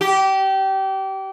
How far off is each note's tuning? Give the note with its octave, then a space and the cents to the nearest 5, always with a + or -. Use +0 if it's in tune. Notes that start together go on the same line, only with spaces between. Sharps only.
G4 -25